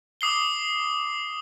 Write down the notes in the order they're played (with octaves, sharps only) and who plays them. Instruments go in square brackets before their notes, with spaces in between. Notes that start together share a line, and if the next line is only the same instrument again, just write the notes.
[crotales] D6 D#6 C7 G7